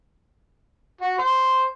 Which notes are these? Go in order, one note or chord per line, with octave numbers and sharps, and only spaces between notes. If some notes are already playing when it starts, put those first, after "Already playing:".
F#4
C5